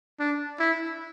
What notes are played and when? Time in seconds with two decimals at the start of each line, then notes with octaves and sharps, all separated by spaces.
0.20 D4
0.59 E4